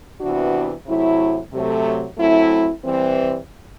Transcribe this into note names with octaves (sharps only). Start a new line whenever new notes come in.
C3 E3 B3 D4 F#4
C3 F#3 A3 E4
C3 F#3 A3
F#3 A3 C4 E4
E3 G3 C4